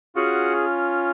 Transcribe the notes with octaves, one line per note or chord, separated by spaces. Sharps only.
C#4 F4 F#4 G#4 F#5